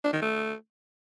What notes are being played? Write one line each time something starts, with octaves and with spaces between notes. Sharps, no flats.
D4
D#3
A3